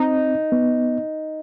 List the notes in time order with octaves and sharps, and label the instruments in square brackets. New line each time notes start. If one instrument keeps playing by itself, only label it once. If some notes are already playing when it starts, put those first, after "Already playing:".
Already playing: [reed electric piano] C4 [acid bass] D#4
[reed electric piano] B3